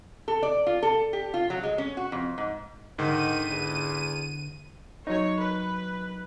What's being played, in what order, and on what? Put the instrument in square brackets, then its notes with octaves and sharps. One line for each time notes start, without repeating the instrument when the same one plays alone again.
[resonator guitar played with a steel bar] A4
D5
F4
A4
G4
F4
F#3
G#3
C#4
F#4
F2
G#2
[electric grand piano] G#2 [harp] D3 [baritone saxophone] D#3 [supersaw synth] D#7
[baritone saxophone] E2
[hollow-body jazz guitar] F#3 D#4 [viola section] C#5
[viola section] B4